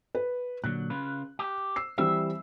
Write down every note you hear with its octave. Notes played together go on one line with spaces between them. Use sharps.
B4
A#2 D3 F#3 F#6
C#3 F4 B4
G4
E6 C7
E3 G3 C4 E5